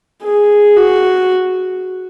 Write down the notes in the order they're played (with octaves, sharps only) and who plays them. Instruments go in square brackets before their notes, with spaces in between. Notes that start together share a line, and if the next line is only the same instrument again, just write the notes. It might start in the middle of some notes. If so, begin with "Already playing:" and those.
[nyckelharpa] G#4
F#4